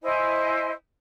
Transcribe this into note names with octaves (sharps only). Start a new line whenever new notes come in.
E4 C5 D#5 G#5